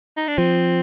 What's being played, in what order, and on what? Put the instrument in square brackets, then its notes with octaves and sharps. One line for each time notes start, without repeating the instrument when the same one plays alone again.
[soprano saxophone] D#4
D4
[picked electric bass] F3 [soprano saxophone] C4